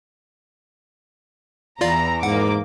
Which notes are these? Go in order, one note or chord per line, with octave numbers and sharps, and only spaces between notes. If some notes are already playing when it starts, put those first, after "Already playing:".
E2 E3 F4 D5 F5 A#5
G#2 A#3 F#5 D6